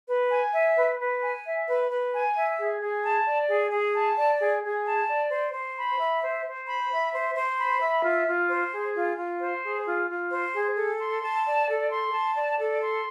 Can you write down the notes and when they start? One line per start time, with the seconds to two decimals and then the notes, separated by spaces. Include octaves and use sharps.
0.08 B4
0.30 G#5
0.53 E5
0.76 B4
0.98 B4
1.22 G#5
1.44 E5
1.66 B4
1.90 B4
2.12 G#5
2.35 E5
2.58 G#4
2.80 G#4
3.03 A5
3.26 D5
3.48 G#4
3.71 G#4
3.93 A5
4.17 D5
4.39 G#4
4.62 G#4
4.85 A5
5.08 D5
5.30 C5
5.53 C5
5.76 B5
5.98 E5
6.22 C5
6.45 C5
6.66 B5
6.90 E5
7.12 C5
7.35 C5
7.57 B5
7.81 E5
8.03 F4
8.26 F4
8.49 C5
8.72 G#4
8.95 F4
9.17 F4
9.40 C5
9.63 G#4
9.85 F4
10.07 F4
10.31 C5
10.53 G#4
10.75 A4
10.98 C6
11.21 A5
11.44 D5
11.67 A4
11.89 C6
12.12 A5
12.34 D5
12.58 A4
12.80 C6